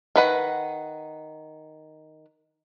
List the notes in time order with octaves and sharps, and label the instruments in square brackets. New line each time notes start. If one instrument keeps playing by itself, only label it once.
[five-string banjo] D#3 B4 F#5